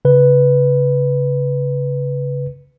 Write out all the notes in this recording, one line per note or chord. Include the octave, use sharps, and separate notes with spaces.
C#3 B4